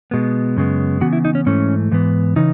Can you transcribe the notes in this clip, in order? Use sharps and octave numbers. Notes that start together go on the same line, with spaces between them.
B2 G#3 B3
F#2 C#3 G#3 B3
C#3 E3 B3 F#4
E4
D#4
C#4
G#2 E3 A3 C#4
G#2 E3 B3
C#3 E3 D#4